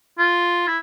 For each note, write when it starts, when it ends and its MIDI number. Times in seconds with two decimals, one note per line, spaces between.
0.19 0.65 65
0.67 0.78 64